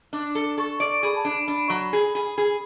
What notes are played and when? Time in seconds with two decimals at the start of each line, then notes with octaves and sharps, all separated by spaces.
0.13 D4 D6
0.35 A4
0.58 A4 C#6
0.80 D5
1.03 G#4 B5
1.15 A5
1.25 D4 B5
1.48 D4
1.70 F#3
1.93 G#4
2.15 G#4
2.38 G#4